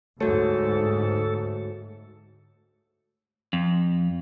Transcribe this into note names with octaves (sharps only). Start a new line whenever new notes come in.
D2 G#2 A3 F#4 A4 C#5
F2